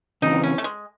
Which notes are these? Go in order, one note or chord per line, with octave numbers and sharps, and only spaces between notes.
C#3 E3 C4 D#4
C#4
A3
G#3